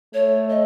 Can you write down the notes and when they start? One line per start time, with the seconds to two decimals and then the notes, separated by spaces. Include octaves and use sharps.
0.14 A3 C#5
0.50 D#5